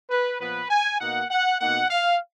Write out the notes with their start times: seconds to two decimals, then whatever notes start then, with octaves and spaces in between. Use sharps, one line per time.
0.11 B4
0.40 A#2 F3 B3 B4
0.70 G#5
1.00 B2 A#3 D#4 F#5
1.30 F#5
1.60 B2 A#3 D#4 F#5
1.90 F5